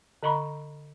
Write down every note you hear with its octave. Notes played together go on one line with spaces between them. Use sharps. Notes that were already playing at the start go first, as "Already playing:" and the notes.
D3 D#5 A#5 B5 C#6